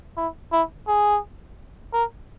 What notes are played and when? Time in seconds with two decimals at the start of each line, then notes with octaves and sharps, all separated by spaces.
0.17 E4
0.52 E4
0.88 G#4
1.93 A#4